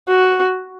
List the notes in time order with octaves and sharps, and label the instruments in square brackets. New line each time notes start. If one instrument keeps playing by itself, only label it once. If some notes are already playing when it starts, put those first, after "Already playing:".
[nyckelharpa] F#4